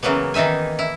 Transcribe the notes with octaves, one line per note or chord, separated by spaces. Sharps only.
C#3 E3 F#3 A#3 B3
D#3 E3 D#4 E5 G#5
E4